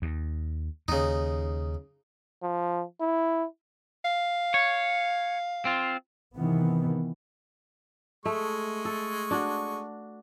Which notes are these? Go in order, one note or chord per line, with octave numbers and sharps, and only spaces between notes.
D#2
D#2 C#3 D#4
F3
E4
F5
C#5
C4 F4
C3 D#3 E3 B3
G#3 A3 C#6
A4
D4 F#4